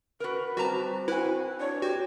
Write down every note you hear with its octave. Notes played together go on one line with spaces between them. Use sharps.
F#4 A#4 B4
G3 C4 F#4 A5 A#5
E4 F#4 B4 G#5
D4 C#5
F#4 G4